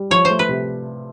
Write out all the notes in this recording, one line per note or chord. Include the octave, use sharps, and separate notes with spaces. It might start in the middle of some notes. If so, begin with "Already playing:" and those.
Already playing: G3
F3 C#5
A3 C5
B4
C3